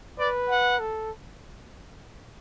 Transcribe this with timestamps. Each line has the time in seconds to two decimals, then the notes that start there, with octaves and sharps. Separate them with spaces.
0.19 B4 D5
0.49 F#5
0.79 A4